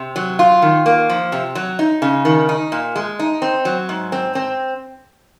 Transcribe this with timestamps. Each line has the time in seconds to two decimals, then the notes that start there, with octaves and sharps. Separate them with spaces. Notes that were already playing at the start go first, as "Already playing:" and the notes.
Already playing: C3
0.16 F#3
0.39 F4
0.62 D#3
0.86 A#3
1.09 F3
1.32 C3
1.55 F#3
1.79 D#4
2.02 C#3
2.25 D#3
2.49 D#4
2.72 A#2
2.96 G#3
3.19 D#4
3.42 C4
3.65 F#3
3.89 G#2
4.12 C4
4.35 C4